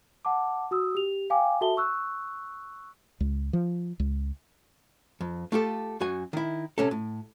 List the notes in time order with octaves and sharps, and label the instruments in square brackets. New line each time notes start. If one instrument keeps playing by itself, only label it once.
[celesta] F#5 A5 D6
F#4 D#6 E6
G4 F7
F5 G5 G#5 D6
F#4 A4 E5 A5 G7
C#6 E6 F#6
[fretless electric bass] C#2
F3
C#2
[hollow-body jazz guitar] F2
A3 F4 G4 A4
F#2 F#4 G#5
D#3 E4
C3 C#4 A4
A2